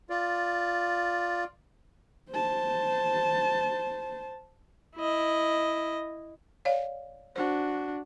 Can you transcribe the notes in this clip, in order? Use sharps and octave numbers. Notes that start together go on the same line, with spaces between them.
F4 D5
C5 A5
E4 D#5
C#5 D5 F5
D4 F#4 C5